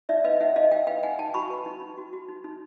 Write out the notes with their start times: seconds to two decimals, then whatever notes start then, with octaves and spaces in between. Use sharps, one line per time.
0.09 D#4 D5 E5
0.24 B4 D#5 F5
0.40 D#4 E5 F#5
0.56 D#4 D#5 F5
0.71 D#4 F5 G5
0.87 B4 F5 G5
1.03 D#4 F#5 G#5
1.19 D#4 G5 A5
1.34 F#4 B5 C#6
1.50 B4
1.66 D#4
1.81 D#4
1.98 F#4
2.13 F#4
2.29 D#4
2.44 D#4